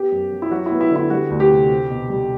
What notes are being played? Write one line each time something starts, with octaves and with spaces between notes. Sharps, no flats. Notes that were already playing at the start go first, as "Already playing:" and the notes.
Already playing: B3 G4
F#2
F#3
E4
F#3 F#4
B3 E4
E4
D3 E4
G3 F#4
D2
G4
C3
C4
B2
G3